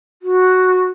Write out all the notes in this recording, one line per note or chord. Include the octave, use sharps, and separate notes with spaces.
F#4